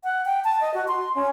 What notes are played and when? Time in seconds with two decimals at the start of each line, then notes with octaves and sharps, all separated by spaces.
0.04 F#5
0.26 G5
0.44 A5
0.61 D#5
0.74 F#4
0.88 C6
1.15 C#4